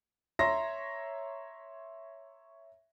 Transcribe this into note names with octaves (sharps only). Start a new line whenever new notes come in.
C#5 E5 A#5 C6 A#6